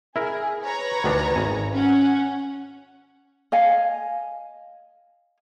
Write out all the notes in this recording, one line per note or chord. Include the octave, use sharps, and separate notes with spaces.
E4 G#4 A#4
B4 C#5 A#5
D2 D#3 D4
G#1 G#5
C#4 F#5
D#5 F5 G#5